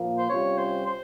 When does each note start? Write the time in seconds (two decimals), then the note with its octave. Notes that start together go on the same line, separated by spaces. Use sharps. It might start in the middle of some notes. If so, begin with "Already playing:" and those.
Already playing: A#2 F3 A#3 F4
0.18 C5
0.30 C3 G3 C#4 F4 C#5
0.58 C5
0.86 C5